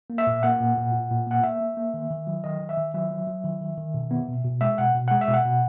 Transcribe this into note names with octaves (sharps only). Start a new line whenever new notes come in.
A#3
E5
A#2
A#3 F#5
A#2
A#2
A#2
A#2
A#3 F#5
A#3 E5
A#3
A#3
D#3
D#3
F#3
D#3 D#5
D#3
E5
D#3
F#3 E5
F#3
F#3
D#3
D#3
D#3
B2
B3
B2
B2
G#3 E5
B2 F#5
B2
G#3 F#5
E5
B2
F#5
B2